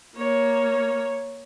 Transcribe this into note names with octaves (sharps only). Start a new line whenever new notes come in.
A#3 C#5